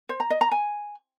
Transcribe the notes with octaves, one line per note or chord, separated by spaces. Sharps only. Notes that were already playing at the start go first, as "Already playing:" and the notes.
C5
A#5
D#5
A#5
G#5